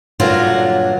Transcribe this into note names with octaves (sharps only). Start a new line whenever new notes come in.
G2 A#2 D3 F#3 F4